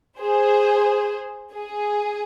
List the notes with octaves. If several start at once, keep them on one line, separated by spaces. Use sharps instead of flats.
G#4 C5
G#4